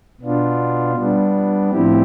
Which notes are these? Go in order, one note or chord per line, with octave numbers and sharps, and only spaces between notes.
B2 B3 D4 F4
G3 B3 D4
A2 F3 C4 E4 G4